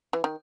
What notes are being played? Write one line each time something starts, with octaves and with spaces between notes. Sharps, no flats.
E3
D#3